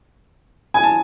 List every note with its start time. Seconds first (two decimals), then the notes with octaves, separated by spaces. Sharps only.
0.74 G#5
0.83 A5